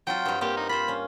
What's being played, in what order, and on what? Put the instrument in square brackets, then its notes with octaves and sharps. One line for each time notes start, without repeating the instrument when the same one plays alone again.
[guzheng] F#3 C4 F4 [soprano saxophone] G5
[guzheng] G2 G3
[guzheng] G3 A#3 C4 [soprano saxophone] G4
[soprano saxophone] D#4
[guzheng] F4 C5 [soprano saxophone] B5
[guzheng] C#4